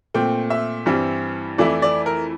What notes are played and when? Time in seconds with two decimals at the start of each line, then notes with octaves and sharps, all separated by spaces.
0.14 A#2 A3 C4 G5
0.50 E5
0.86 G2 E3 G3 C4 E4
1.58 F2 E3 A3 E4 D5
1.82 D5
2.06 A#4